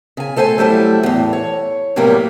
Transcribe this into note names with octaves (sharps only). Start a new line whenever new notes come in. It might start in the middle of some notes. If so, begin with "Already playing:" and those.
C#3 G#5
A3 A4 C5 E5 G#5
F#3 G3 A3 E4
E2 A2
C#5
A2 C3 F#3 G3 A#3 B3